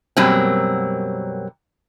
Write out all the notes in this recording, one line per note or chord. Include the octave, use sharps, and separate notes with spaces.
F#2 B2 F#3 G3 A#3 C4